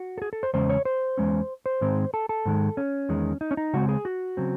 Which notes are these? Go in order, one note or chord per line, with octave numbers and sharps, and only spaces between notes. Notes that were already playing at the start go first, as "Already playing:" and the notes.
Already playing: F#4
A4
G#4
A4
C5
E2 C#3 G#3 C#4 C5
C#5
C5
E2 C#3 G#3 C#4
C5
G#2 D#3 G#3 C4
A4
A4
G#2 D#3 G#3
C#4
E2 D#3 G#3
D#4
C#4
D#4
C#3 G#3 C4 F#4
G#4
F#4
C#3 F#3 C4